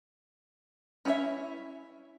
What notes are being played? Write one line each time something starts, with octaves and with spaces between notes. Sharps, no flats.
C#4 E4 F#4 C#5 E5